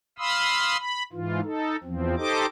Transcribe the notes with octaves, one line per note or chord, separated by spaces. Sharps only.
F5 B5 C6 D#6 E6
B5
G#2 E3 F4
D#4 A4
E2 F3 C4
D#4 G4 A4 C5 D#5 D6